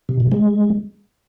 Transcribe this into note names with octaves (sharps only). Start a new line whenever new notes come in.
C3
B2
G#3